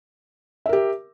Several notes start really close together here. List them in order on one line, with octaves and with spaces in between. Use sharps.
E5 A#4 G4